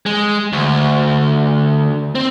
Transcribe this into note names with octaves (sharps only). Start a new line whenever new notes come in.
G#3
D2
C4